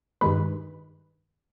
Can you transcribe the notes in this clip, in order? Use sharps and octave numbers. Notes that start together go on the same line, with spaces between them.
G2 D#3 G#3 B4